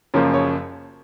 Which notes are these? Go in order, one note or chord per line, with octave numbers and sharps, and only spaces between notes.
F#1 F#2 C#3 F3 A#3 C#5
C#5